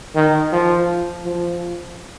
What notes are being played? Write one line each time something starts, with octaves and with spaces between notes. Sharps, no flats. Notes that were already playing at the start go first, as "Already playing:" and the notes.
D#3
F3
F3